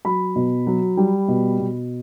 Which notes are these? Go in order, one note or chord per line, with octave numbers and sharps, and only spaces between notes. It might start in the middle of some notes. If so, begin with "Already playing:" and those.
F#3 B5
B2
F#3
G3
B2
B2